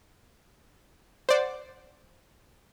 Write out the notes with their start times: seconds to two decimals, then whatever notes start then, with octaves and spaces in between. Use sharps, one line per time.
1.29 C5 D5 F#5